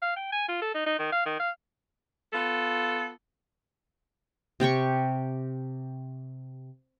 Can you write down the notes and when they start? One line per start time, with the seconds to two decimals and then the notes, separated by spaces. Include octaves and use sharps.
0.02 F5
0.16 G5
0.32 G#5
0.48 F4
0.62 A4
0.74 D#4
0.86 D#4
0.99 D#3
1.12 F5
1.26 D#3
1.39 F5
2.33 B3 F4 A4
4.60 C3 G4 G5 C#6